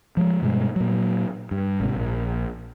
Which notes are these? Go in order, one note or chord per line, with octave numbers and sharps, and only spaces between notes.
F3 G#3
G2 B2 G3 G#3
A#2 F#3
G2
G#1 G#2 C3
A#1